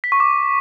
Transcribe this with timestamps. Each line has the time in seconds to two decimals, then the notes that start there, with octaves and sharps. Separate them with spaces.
0.04 B6
0.12 C#6
0.20 D6